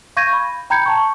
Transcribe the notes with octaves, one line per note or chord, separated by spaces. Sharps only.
F5 C#6 G6 G#6 A#6 D#7
B5
G5 A#5 B5 G6 G#6 C#7
A5 C#6